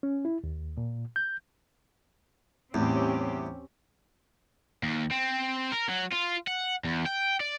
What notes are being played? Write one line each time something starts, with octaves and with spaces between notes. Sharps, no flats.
C#4
E4
D#2
A#2
G6
E2 A2 G3 C4 C#4 G4
D#2
C4
A#4
F#3
F4
F#5
E2
G5
D5